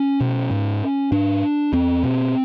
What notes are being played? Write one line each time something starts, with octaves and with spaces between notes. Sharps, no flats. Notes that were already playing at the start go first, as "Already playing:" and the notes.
Already playing: C#4
B2
G#2
G#2 D4
E2 C4
B2